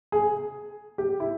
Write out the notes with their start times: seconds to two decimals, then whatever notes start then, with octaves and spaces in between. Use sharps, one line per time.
0.12 G#4
0.98 G4
1.20 E4